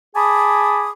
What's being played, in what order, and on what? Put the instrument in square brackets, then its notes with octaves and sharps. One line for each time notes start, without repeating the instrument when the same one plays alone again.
[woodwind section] G#4 G#5 A5 B5 D6 D#6